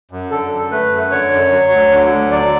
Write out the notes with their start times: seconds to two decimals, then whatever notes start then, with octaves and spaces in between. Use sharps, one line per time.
0.11 F#2
0.31 D3 A4
0.52 F#2
0.71 A3 B4
0.92 F#2
1.11 D3 C#5
1.32 F#2
1.52 F#3
1.72 D2
1.91 D3
2.11 D2
2.32 F#3 D5